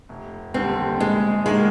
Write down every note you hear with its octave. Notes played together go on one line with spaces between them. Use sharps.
F1
D#2 D3 G3 C4
A#1 G#3
G#2 D#3 G#3 A#3